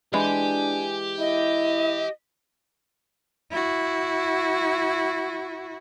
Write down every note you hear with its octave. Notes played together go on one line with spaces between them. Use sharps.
E3 G#3 D4 G4 G#5
E4 D#5
E4 F#4